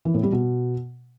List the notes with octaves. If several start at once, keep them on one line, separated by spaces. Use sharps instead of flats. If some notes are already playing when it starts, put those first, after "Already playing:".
E3
A2
G3
B2